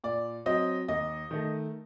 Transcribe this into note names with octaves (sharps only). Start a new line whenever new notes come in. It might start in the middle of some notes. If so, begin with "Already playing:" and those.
A#2 D5
F#3 C4 D#5
D#2 D#5
D#3 A3